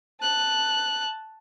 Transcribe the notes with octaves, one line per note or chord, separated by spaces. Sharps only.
A5 F#6